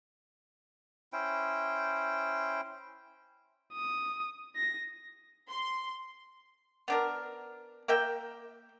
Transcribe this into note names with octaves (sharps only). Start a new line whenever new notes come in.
C#4 E4 C5 G5
D#6
A#6
C6
B3 D4 A#4
A#3 A#4 E5 G5